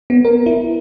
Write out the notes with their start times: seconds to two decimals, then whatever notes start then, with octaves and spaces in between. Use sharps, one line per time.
0.10 B3
0.25 A#4
0.46 E4